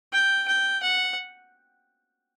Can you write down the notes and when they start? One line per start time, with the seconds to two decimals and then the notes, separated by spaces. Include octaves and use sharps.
0.13 G5
0.48 G5
0.83 F#5